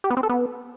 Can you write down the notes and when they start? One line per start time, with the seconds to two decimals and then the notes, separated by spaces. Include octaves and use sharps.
0.04 G4
0.10 B3
0.17 C4
0.23 A4
0.29 B3